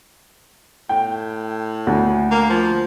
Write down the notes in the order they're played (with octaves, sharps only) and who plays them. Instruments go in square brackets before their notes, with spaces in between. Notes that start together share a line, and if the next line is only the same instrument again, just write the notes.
[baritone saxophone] A2 [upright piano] G5
[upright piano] D2
[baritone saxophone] A#3
F3